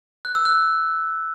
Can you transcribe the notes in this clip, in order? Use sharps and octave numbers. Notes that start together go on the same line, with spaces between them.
F#6
E6
F#6